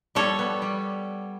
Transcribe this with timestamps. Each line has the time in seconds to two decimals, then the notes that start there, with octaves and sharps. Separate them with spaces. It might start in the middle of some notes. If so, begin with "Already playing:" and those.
0.15 G3 A4 C#5
0.39 B3
0.62 G3